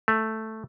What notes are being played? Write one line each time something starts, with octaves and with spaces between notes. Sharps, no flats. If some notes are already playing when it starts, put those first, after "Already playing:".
A3